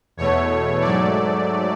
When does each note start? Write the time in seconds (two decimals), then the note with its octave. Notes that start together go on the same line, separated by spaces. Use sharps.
0.17 E2 B2 A3 C#5
0.81 G#2 F#3 A3 D5